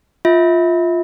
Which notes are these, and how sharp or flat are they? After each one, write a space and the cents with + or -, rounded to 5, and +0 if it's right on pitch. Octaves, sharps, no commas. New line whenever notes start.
F4 +0 E5 -35